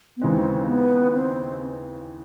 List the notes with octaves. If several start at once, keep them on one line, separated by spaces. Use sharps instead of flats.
B3
D#2 C#3 E3 G#3 C4
B3
C4